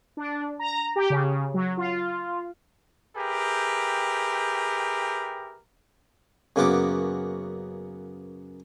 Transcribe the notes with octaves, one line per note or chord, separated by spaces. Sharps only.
D4
A#5
G4
C#3
F#3
F4
G4 G#4 A#4 B4 E5 G5
F#2 C#3 A#3 B3 F#4 D6